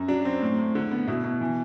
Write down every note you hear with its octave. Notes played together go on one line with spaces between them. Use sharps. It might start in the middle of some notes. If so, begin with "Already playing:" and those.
Already playing: F#2
F#3 D4
C4
A2
A2
D3
B3
B2 E4
B2
E3